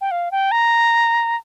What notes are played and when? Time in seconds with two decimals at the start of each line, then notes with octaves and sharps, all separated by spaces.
0.01 G5
0.11 F5
0.31 G5
0.51 A#5